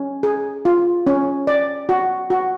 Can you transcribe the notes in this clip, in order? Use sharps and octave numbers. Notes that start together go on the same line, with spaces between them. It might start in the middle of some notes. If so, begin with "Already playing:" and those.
Already playing: C#4
G#4
F4
C#4
D5
F#4
F#4